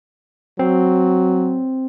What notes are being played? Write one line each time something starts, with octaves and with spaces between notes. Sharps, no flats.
F#3 C4